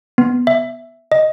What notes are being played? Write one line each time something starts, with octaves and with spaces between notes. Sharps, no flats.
B3
E5
D#5